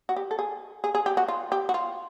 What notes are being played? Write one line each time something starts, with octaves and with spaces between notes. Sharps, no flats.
F#4
G4
A4
G#4
G#4
G#4
G4
F#4
F4
G4
F#4
F4